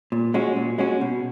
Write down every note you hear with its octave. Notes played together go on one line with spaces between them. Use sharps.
A#2
G#3 C#4 F#4
A#2
G#3 C#4 F#4
B2